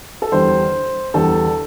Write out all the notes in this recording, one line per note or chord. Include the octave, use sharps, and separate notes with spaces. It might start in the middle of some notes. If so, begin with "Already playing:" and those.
A4
E2 D3 G3 C5
E2 D3 G3 A4